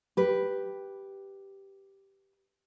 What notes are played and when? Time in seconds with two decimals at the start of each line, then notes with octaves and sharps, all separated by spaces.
0.17 G4 B4